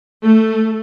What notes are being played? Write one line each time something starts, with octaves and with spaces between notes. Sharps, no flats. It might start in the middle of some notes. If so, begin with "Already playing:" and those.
A3